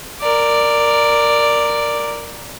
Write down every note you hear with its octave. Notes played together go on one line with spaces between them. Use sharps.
A#4 D5